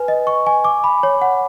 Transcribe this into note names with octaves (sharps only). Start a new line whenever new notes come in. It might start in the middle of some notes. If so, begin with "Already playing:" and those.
Already playing: B4 G#5
D#5
C#6
G#5
D6
B5
C#5
F#5